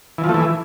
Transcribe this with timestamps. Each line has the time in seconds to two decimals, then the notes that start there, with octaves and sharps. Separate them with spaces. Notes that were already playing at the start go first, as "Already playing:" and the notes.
0.18 E3
0.24 F3
0.29 A3
0.34 E3